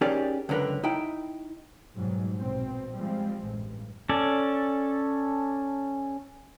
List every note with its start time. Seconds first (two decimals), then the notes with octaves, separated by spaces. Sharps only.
0.01 C#4 D#4 G4 G#4 A#4 D5
0.49 C#2 F#2 D3 A#4 B4
0.83 D#4 E4 G5
1.96 G#2 B2 F#3 G3
2.38 A#1 B2 C4
2.94 F3 G3 G#3 C4
3.43 A1 G2
4.09 C#4 A4 D5